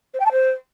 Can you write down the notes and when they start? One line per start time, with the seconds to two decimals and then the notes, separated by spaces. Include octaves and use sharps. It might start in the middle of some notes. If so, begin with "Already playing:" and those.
0.13 C5
0.19 G5
0.25 A5
0.31 C5